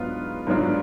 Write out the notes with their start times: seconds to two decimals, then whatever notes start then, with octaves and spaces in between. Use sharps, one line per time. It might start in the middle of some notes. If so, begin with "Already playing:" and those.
Already playing: G#2 F#3 B3 D4 F4
0.47 G#2 F#3 B3 D4 F4